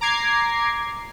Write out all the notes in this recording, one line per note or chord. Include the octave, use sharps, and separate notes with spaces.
A#5 D6 G#6 C7